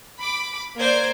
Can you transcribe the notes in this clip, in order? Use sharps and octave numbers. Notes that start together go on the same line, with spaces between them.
B5 D6
A#3 C5 D5 G#6 D7